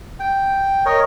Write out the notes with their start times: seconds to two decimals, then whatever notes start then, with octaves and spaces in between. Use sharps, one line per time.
0.20 G5
0.85 A#4 C#5 D#5